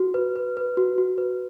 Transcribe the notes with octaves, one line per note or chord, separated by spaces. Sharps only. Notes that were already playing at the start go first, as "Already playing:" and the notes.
Already playing: F#4
B4
B4
B4
F#4
F#4
B4